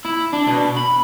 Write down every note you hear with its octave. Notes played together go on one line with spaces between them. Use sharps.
E4
D4
B2
B5